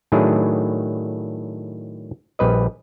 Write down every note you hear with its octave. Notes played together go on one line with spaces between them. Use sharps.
A2 D#3 F#3 D4 E4 G#4
A#1 G3 B4 D#5